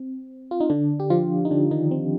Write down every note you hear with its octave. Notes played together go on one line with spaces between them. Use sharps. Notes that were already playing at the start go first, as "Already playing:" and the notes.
Already playing: C4
F4
D#4
D3 D4
G4
F3 F4
D#4
D3 D4
D#3 D#4
C4